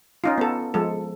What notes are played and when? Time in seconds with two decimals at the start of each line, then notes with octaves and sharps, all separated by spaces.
0.24 C#4 D#4 F4
0.38 B3 A4
0.74 F3 G#3 A4